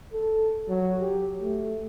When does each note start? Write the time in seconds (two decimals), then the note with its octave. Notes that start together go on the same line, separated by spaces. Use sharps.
0.13 A4
0.69 F#3
1.00 G4
1.41 A3